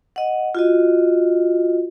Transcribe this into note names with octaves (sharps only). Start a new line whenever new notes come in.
D#5 F#5
F4 F#4 D#5